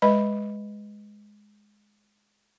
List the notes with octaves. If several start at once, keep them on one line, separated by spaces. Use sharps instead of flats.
G#3 B4 D#5 B5